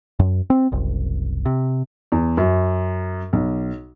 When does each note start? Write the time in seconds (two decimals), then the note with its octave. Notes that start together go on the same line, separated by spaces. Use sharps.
0.19 F#2
0.50 C4
0.72 F#1 C2
1.46 C3
2.12 E2
2.37 F#2
3.33 B1